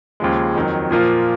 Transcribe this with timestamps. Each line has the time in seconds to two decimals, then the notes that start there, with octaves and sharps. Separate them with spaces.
0.20 D#2 C#3 F3 G#3
0.56 F2 D#3 F#3
0.91 A#2 F3 A#3 F4